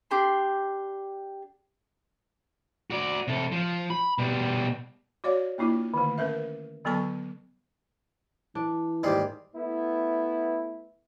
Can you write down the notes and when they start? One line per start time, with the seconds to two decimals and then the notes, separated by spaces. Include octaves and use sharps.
0.11 D4 G4 C6
2.90 F#4 D5
3.28 C3 A4
3.52 F3
3.90 B5
4.18 B2 G3
5.24 F#4 C#5 D5 F5
5.58 A#3 D4 E4 F4
5.94 D3 D#3 A3
6.18 C#4 A#4 B4 E5
6.85 D3 F#3 B3 A4 A5 C#6
8.55 E3 D4
9.03 D#2 G#2 G3 G4 G#4
9.56 A3 B3 E4